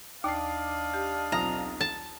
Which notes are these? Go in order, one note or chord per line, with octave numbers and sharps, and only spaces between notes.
D#2 D4 D#5 F5 D6 C7
G4
B1 C4 F4 A#5 D#6
A5